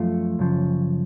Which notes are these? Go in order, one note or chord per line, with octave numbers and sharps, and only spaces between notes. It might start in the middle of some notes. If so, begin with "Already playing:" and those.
Already playing: F#2 F3 A3 F4
F#2 C#3 F3